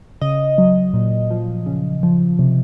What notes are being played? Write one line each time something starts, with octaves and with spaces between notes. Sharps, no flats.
C#3 D#5
F#3
A#2
F3
C#3
F3
C3